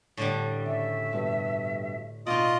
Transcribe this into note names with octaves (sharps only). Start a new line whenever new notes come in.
A2 D3 G3
C#3 E5
G2 B2
B2 D#4 F4 D5 D#5 D#6